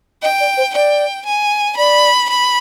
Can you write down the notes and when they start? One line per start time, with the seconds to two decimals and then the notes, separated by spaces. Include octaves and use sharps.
0.22 D#5 G5
0.40 D5
0.57 C5
0.75 D5 G5
1.26 G#5
1.77 D5 B5
2.30 B5